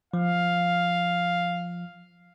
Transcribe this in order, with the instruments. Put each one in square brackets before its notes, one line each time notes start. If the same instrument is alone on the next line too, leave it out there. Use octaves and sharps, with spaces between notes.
[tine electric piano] F3 [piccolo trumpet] F5